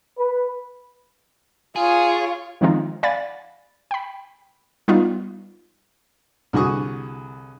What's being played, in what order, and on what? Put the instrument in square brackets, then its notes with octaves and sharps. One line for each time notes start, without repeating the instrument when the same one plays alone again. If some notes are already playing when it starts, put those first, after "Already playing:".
[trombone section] B4
[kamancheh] F4 C#5 [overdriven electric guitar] G#4
[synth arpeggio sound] D#3 F3 G#3 C4 D#4 F4
D5 F5 F#5 G#5 B5 A6
G5 B5
G3 B3 D#4 F4
[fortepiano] C2 D3 F#4 G#4 C#6 D#6